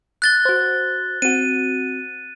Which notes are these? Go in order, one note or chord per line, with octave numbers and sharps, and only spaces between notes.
F#6 A6 G7
F#4 C5
C4 F#4 D#7